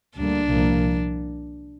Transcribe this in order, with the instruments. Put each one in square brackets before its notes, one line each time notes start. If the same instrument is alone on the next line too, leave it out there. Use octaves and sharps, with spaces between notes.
[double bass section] D2 D3 G3 A#3 [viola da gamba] D4
[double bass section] C2 A#2 F3 A#3